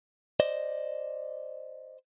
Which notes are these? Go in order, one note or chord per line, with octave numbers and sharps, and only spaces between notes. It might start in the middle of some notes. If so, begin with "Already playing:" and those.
C5 D5 D#5